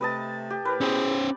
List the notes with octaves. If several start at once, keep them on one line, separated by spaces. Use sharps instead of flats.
C3 A3 B4 D#5 A5
G4
A2 A#4 B4
B2 C#4 E4 G#4 C5